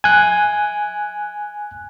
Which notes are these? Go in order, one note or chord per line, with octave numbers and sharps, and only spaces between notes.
G#5 F#6